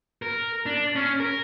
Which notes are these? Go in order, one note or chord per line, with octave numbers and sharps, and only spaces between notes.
A#4
D4
C#4
A#4